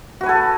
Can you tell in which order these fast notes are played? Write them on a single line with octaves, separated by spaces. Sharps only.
F#4 B4 G#5 A4